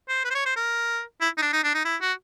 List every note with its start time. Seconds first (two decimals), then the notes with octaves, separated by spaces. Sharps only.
0.09 C5
0.25 B4
0.31 C5
0.35 C#5
0.46 C5
0.57 A#4
1.21 E4
1.38 D#4
1.42 D4
1.53 D#4
1.64 D4
1.75 D#4
1.85 E4
2.02 F#4